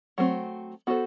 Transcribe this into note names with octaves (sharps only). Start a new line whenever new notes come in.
F#3 A3 C4
B3 F#4 A4 C5